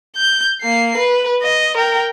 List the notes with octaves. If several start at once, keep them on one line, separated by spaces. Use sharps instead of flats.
G6
A#3 C7
B4
D#5
A#4 G5